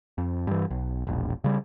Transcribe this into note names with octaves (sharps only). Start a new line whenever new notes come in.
F2
G2 E3
B1
E1 A#1
C#3 G3